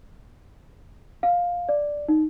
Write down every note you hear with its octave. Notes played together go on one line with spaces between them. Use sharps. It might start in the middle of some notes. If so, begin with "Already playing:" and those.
F5
D5
D#4